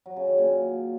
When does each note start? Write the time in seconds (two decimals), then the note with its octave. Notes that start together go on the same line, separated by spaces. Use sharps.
0.06 F#3
0.16 C#3
0.27 D#3
0.38 A#2